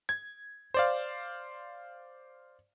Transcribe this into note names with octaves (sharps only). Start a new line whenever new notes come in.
G#6
C5 D5 F5